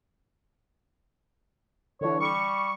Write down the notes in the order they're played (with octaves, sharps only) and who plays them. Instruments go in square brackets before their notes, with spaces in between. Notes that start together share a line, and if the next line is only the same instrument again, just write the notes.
[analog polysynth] D3 E3 [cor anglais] C#5
[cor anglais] G3 [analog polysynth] C#6